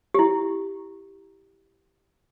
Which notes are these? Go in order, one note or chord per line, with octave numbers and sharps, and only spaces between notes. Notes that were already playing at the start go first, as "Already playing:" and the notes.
E4 G4